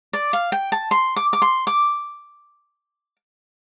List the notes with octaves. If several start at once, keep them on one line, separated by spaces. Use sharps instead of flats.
D5
F5
G5
A5
C6
D6
D6
C6
D6